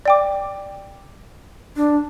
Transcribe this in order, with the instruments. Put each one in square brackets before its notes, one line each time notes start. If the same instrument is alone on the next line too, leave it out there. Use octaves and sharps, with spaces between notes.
[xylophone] D5 G5 D6
[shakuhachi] D4